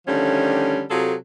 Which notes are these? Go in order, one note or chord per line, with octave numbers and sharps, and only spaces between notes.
D3 D#3 F3 G3 A3 C#4
C3 F#3 F4 G#4 A4